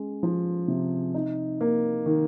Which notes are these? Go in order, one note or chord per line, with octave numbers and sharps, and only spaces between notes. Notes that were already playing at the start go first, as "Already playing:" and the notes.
Already playing: G#3 C#4
F3
C3
D#4
A#3
D#3